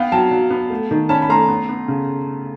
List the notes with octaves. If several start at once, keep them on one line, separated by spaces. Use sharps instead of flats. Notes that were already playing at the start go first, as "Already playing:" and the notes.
Already playing: B3 F5 G5
F#3 G5 A5
F#3
B3
A3
D#3
C#4 A5 B5
B5
A3 A#5 C6
B3
B3
C#3